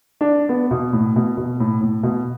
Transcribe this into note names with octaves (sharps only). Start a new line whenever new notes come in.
D4
B3
B2
A2
B2
B2
A2
A2
B2